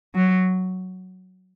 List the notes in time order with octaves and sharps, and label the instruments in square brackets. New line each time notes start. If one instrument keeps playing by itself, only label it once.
[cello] F#3